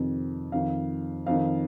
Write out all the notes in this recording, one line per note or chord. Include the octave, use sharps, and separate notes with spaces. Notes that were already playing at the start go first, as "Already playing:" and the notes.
Already playing: F2 C3 D#3
F2 D#3 F5
F2 D#3 F5